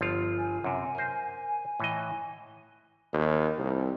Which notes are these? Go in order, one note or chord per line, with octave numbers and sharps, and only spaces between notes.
G1 F3 F4
G#5
F#2 C3
A#4 C5
A2 E3 D#5
D#2
C2